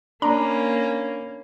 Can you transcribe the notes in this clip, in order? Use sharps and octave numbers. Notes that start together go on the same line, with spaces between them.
A#3 C#4 D4 A#5 B5